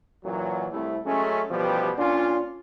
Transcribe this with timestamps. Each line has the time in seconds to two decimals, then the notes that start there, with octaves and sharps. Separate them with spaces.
0.24 F#2 A#2 E3 F#3
0.71 C2 A3 E4
1.06 F#3 G#3 A3 C#4
1.51 A1 B2 F3 G3 G4 B4
1.98 A#2 C#4 D4 F4